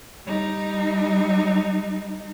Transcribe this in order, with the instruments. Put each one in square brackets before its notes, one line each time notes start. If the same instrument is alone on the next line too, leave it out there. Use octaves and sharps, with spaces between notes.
[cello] G3 D#4